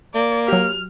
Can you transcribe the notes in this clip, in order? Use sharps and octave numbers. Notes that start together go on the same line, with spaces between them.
A#3 D5
F#3 G4 F6